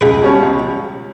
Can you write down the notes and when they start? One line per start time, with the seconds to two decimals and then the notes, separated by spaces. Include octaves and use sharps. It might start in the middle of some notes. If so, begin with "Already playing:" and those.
0.01 C#2 G#4 B4
0.22 B2 G3 C#4
0.42 C#2